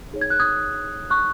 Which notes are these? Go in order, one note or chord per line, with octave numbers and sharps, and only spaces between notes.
D#4 G#4 C#5
G#6
F#6
D#6 G#6
C#6 F#6